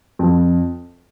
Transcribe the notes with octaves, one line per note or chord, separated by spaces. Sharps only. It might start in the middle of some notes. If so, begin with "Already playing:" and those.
F2